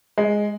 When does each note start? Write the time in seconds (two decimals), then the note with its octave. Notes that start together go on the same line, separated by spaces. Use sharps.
0.18 G#3